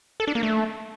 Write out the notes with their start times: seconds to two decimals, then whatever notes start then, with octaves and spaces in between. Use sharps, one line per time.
0.20 A4
0.27 D4
0.35 A#3
0.43 A3